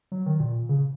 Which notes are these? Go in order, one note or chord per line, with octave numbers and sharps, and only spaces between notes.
F#3
D#3
A#2
C#3